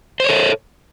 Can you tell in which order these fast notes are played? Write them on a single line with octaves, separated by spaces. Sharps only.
C5 C#5 A4